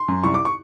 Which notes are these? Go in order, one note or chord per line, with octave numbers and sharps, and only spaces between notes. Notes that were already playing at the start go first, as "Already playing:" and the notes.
Already playing: C6
F#2
C2 C#6
D6
C#6